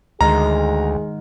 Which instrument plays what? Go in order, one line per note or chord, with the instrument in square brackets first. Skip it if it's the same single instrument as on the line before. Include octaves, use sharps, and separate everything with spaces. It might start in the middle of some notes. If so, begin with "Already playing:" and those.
[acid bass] D2 [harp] G#2 D#3 C6 [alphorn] G#4 [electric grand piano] A#5